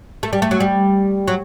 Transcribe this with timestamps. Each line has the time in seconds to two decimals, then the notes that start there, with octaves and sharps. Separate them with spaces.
0.23 A3
0.33 G3
0.42 A3
0.51 F#3
0.60 G3
1.28 F#3